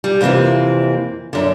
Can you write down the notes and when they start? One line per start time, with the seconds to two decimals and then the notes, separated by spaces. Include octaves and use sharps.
0.04 G3
0.21 F2 C3 E3 A#3 C4
1.33 F#2 D3